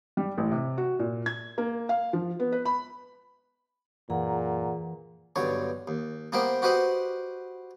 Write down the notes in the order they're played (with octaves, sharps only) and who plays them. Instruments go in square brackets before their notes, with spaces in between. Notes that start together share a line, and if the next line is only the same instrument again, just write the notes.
[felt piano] G3
A1
C3
F#4
A#2
G#6
A#3
F5
F3
B3
B4
B5
[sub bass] F#2 [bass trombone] A#2 [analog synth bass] E3 [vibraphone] G#4 F#5 A#5
[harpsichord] B1 G2 D3 C#5
D#2
A#3 B3 G4 A#4 C5 G5
F#4 G4 B4 C5 D#5 F#5